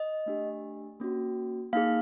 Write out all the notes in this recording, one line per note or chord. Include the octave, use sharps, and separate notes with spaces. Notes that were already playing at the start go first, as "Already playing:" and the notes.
Already playing: D#5
A3 D4 G4
A#3 C#4 F#4
A#3 D#4 G#4 F5